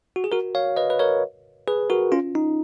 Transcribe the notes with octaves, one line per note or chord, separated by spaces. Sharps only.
F#4
G#4
F#4 A#4
C#5 F5
B4 D#5
B4
A#4 C#5
G#4 B4
F#4 A#4
C#4 F4
D#4